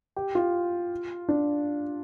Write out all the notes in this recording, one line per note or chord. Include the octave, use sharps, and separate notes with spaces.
G4
F4
D4